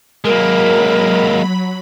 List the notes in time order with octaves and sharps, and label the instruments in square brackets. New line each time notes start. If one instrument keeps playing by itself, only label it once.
[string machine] F#3 B5 [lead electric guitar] G#3 A#3 [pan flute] A#4